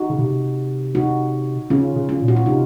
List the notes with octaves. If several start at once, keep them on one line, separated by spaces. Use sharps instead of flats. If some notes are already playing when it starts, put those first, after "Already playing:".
Already playing: D#4 F#4
C#3
C3
D#4 F#4
C#3 C#4 F4
C#3
C#4 F4
A#2
F#4
F4
C3 D#4